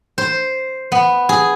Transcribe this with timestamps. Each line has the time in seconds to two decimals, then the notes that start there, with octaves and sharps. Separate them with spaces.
0.18 C5
0.92 B3
1.29 G#4